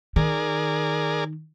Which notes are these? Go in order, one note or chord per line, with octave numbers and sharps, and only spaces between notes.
D#3 G#4 A#4 D5